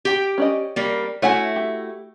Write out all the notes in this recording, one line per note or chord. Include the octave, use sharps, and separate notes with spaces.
G4 G5
C#4 D5 D#5
G3 A#3
A3 E4 F#4 C#5 F#5 G#5
G4